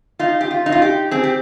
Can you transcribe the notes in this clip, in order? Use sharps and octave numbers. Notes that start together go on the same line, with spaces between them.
D#4 F4
G4
F4
D#4
F4
G4
C4 G#4
G4